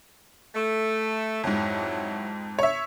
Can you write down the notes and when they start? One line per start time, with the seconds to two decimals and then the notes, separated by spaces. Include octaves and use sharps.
0.55 A3
1.44 F2 G#2 F#3 E4
2.59 C#5 E5